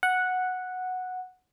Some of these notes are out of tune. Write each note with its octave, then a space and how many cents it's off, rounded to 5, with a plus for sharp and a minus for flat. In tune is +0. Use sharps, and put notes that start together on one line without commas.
F#5 -5